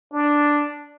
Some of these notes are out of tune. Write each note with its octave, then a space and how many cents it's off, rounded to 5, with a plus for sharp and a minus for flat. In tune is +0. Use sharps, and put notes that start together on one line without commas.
D4 +0